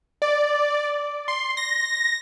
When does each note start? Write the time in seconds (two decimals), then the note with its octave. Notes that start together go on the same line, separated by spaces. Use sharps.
0.22 D5
1.28 C6
1.57 A#6